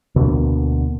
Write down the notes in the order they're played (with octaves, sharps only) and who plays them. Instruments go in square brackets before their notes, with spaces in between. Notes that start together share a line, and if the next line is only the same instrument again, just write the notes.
[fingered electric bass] D2 B2 D3 A#3